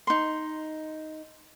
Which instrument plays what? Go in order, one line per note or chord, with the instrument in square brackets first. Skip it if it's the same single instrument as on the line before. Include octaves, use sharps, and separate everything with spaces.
[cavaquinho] D#4 C6